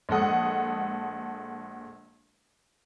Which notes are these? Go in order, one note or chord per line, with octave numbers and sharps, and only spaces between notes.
A#1 G#3 A4 F#5 D#6